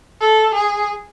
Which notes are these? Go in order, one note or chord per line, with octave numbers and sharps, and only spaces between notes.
A4
G#4